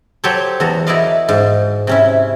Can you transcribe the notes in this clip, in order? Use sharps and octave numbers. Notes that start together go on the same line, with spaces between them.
F#3 G4 A4 C5 C#5
E2 F#4 A4 A#5
E4 F#4 A#4 D5 D#5 F5
G#2
C3 C#4 E4